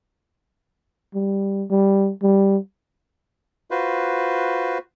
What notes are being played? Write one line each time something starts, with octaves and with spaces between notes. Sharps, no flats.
G3
G3
G3
F4 F#4 B4 C5